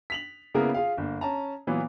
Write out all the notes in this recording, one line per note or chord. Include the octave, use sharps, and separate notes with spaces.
B6 F7 F#7
C#3 A#3 B3 E4 G#4 A#4
F4 G#4 F5
G1 A#3
C#4 A5 A#5
A#2 E3 F#3 B3 F4